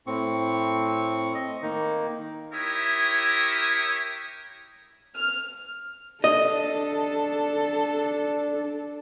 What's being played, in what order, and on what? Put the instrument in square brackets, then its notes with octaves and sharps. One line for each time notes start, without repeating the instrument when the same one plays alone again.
[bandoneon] A2 C4 C#6
D#5
D#3 A#3 D#4
[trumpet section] E4 G4 A#4 C#5 E5 D#6
[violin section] F6
[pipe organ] D4 [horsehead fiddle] A4 [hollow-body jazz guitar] D#5